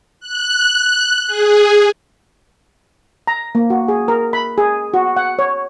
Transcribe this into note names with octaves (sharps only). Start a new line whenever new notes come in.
F#6
G#4
A#5
A#3
F#4
G#4
A#4
B5
G#4
F#4
F#5
C#5